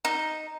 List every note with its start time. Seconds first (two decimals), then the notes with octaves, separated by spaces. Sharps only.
0.05 D#4